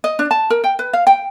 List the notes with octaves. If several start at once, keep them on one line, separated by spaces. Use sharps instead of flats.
D#5
D4
A5
A#4
G5
B4
F5
G5